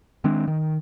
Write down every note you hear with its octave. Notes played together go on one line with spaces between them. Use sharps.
D#3 G#3 C4 D4
D#3